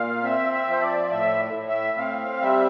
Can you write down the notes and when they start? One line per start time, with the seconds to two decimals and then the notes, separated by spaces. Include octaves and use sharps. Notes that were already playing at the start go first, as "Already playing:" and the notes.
Already playing: A#2 F5
0.23 C4 E5
0.53 E5
0.67 F3 C5
0.81 D5
1.10 A2 E5
1.54 A2
1.68 E5
1.98 C4 F5
2.41 G3 E5